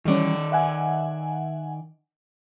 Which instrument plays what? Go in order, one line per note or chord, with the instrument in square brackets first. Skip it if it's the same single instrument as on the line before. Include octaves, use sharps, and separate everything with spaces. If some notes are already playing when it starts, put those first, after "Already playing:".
[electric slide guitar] D#3 D5 [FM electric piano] E3 G3 C#4
[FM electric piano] E5 F#5 G#5